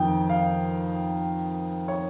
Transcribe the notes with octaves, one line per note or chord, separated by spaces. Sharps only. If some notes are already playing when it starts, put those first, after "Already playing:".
Already playing: F2 D#3 G5
F5
C#5